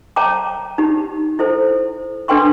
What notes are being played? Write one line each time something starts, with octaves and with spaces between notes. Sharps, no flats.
C#5 G5 A5 A#5 D6
D#4 G4
E4 A4 C5
D4 A4 B4 G5 C6 C#6